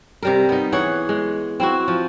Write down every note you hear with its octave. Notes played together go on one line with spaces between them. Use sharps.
C3 G3 A#4
B3 D#4
E3 G#4 C#5 F#5
G#3
C4 E4 F#4
F3